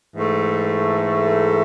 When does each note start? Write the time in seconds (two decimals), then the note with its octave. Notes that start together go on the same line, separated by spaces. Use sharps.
0.16 G#2 E3 A3